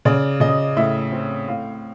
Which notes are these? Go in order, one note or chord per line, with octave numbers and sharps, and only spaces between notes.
C#3 D5
C#3 D#5
A2 E5
C4
A2 F5